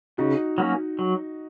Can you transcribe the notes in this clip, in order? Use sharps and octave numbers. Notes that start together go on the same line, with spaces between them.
C#3 D#4 F#4
F#3 A#3 C#4
F#3